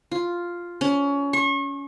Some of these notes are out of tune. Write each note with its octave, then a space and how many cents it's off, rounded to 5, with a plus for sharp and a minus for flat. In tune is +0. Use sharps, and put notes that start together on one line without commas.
F4 +0
C#4 +25
C#6 -35